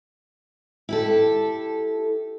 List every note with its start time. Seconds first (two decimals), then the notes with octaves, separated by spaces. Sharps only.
0.89 E4 G4 A4